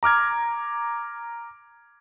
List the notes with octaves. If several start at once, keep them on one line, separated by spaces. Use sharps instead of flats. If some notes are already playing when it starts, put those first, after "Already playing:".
A#5 D6 F6 G#6